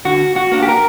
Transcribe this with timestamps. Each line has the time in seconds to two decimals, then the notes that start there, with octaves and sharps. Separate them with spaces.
0.05 D3 F#4
0.36 F#4
0.52 A#3 D4
0.63 G4
0.69 A#4